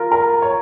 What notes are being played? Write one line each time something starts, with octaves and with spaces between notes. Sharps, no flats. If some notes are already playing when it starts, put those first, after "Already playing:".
Already playing: F4 A#4
A#4
C#5